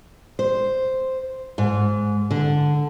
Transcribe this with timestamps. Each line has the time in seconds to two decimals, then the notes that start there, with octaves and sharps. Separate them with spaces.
0.39 C5
1.58 G#2
2.31 D3